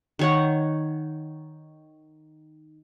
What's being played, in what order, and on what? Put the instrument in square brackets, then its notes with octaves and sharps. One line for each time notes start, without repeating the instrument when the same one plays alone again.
[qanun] D#3 C#5 F#5